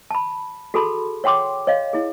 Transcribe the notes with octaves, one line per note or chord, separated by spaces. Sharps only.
A5 B5
F#4 G#4 A4 A5 B5 C6
C#5 F#5 G5 C6 D6
C#5 D#5 F5
E4 G#4